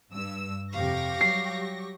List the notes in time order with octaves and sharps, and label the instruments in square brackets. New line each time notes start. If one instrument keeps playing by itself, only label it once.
[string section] G2 E6
[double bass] F2 C3 [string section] G4 C#6 A#6 [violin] F5
[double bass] F#3 G3 [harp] C7